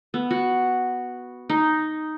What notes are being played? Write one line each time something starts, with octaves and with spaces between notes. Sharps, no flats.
B3
F#4
D#4